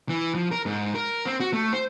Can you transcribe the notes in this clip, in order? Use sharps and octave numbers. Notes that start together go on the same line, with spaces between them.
E3
F3
A#4
G#2
A#4
C4
F#4
A3
C5